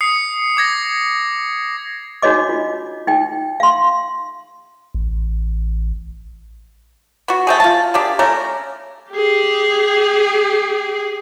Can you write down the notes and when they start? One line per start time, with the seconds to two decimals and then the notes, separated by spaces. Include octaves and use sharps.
0.01 D#6 C7 C#7
0.57 D6 G#6 A#6
2.22 D4 D#4 F#4 C#5 D#5 D6
2.49 F4
3.07 D#4 G5
3.60 F5 C6
4.94 A1
7.28 B3 F#4
7.47 A3 C4 G#4
7.60 F4 A5
7.94 A#3 D4 G4 G#4
8.19 A3 C#4 A#4
9.12 G4 G#4